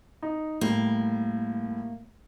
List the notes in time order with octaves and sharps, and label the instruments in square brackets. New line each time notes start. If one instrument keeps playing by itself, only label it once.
[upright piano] D#4
[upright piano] A2 G3 [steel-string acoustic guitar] A#3